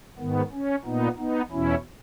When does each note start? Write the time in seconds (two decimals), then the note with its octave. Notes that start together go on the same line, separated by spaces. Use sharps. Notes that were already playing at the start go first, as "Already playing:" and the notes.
0.19 G#2 D#3 B3
0.52 C#4
0.84 A#2 B3 D#4
1.18 B3 D#4
1.51 E2 B2 C#4 E4